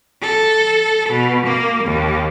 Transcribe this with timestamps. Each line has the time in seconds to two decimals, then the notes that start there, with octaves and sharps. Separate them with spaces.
0.22 A4
1.10 B2
1.47 A#3
1.84 D#2